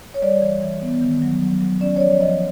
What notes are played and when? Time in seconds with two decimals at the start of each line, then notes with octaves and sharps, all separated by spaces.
0.14 C#5
0.22 G3 D5
0.42 E3
0.62 E3
0.82 B3
1.01 D#3
1.22 F#3
1.41 F#3
1.61 F#3
1.81 C#4 D5
1.96 C#5
2.00 F3 D5
2.20 F3 D#5